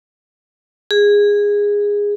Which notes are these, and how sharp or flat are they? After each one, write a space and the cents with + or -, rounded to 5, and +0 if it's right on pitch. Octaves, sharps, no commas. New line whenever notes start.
G#4 -15